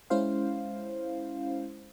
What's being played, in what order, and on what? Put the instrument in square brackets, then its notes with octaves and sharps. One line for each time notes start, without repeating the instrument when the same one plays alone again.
[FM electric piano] G#3 C#4 E4 C5 F5